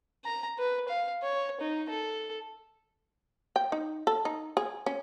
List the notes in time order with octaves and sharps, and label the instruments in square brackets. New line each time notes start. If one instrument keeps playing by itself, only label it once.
[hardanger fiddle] A#5
B4
F5
C#5
D#4
A4
[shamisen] G5
D#4
A4
D#4
G#4
C#4